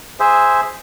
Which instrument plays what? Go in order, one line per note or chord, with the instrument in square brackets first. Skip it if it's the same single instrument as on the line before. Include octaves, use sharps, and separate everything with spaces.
[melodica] G#4 C5 E5